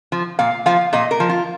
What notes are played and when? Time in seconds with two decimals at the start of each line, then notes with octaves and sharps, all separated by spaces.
0.12 F3
0.39 A#2 F5
0.66 F3 F5
0.93 A#2 D#5
1.11 A#4
1.20 F3
1.29 F4